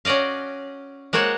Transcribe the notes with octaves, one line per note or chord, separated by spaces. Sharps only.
C#4 F#4 D5 D#5 F5
G#3 A#3 F#4 C5 C#5 F#5